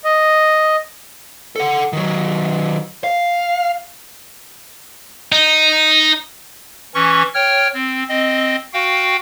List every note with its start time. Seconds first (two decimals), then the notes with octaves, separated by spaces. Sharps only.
0.04 D#5
1.56 A4 F#5
1.93 D#3 F#3
3.04 F5
5.32 D#4
6.95 E3 C#4 C#6
7.34 C#5 G5 F6
7.74 C4
8.09 C4 D#5
8.73 F#4 F5 G5